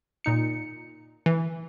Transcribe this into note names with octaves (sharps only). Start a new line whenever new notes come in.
A#2 D#4 C#7
E3